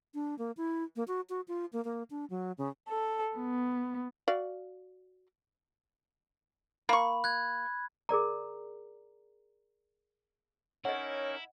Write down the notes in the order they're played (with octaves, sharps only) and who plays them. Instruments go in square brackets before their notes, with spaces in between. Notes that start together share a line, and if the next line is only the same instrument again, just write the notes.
[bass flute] D4
A#3
E4
A#3
F#4
F#4
F4
A#3
A#3
D4
F#3
C#3
[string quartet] A4
B3
[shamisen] F#4 D5 F5
[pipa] A#3 C#6 [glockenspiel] B5
[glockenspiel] F#6 G#6
[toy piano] G#4 A#4 D5 A#5
[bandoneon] C#4 D#4 A#4 [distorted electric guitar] E4 [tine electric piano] C#5 [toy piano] D#5 F#5